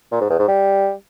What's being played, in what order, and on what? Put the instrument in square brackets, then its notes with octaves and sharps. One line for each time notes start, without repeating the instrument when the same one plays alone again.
[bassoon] A#2
G#2
E2
G#2
G3